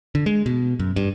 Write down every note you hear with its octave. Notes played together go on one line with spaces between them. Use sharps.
D3
G#3
B2
F#2
G2